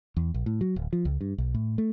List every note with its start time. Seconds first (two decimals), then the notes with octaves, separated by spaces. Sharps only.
0.17 E2
0.34 A#1
0.46 A2
0.61 F#3
0.76 D1
0.93 F3
1.05 C#2
1.21 G2
1.38 B1
1.54 A2
1.78 A3